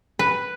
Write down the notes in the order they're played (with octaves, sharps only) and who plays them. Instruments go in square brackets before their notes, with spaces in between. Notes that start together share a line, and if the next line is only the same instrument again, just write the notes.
[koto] B4